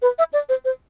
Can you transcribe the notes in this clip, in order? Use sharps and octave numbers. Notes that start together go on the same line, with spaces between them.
B4
E5
D5
C5
C5